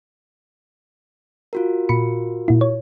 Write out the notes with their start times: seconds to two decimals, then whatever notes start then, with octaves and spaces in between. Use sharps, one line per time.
1.53 F4 F#4 A#4
1.89 A#2 B5 C#7
2.48 A#2 E4
2.61 C#5